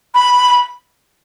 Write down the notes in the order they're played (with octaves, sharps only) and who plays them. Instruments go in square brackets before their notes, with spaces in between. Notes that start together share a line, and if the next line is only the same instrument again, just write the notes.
[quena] B5